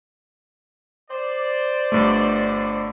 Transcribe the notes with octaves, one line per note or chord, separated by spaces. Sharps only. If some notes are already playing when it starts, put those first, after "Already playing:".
C5 D5
G1 G2 A3